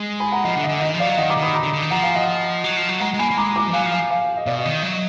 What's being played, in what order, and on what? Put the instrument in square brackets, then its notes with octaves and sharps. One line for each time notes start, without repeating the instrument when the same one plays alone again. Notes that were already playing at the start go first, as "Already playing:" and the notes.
Already playing: [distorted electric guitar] G#3
[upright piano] G#5 B5
F#5 A#5
[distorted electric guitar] F3 [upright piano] D#5 F#5
[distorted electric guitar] D3
[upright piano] D#5
[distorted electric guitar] D3
[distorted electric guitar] D#3 [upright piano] D#5
[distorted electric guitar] F3
[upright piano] D5 F5
[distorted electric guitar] F#3
[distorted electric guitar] D#3 [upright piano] D#5 F#5
[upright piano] A#5 D6
[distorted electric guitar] D#3
[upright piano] B5 D#6
A#5 D6
[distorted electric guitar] D3
D3
D#3
[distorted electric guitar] F3 [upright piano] F#5 A#5
[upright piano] F5 G#5
D#5 F#5
[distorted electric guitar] F#3
F3
F#3
[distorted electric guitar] G#3 [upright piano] F#5 A#5
[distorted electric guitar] G#3
[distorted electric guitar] A#3 [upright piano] G#5 B5
[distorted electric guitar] A#3
[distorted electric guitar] G#3 [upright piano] A#5 D6
[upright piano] A#5 D6
[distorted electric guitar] F3
[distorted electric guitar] F#3 [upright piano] F5 G#5
[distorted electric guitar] F3
[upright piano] F5 G#5
F5 G#5
D#5
[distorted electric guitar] B2 [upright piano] D5 F5
[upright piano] D#5
[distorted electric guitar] D#3
[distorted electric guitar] F#3 [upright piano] D#5